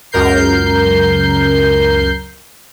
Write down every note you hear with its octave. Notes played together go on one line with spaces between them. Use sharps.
C#2 F#2 A#4 G6 C7